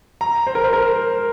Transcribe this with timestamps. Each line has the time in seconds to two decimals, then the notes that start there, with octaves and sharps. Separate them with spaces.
0.21 A#5
0.47 C5
0.55 A#4
0.64 C5
0.73 A#4